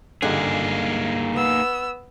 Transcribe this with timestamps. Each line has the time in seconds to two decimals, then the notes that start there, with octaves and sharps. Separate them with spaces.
0.22 C#2 G2 D3 A#3 D#4 G#4
1.34 B3 E6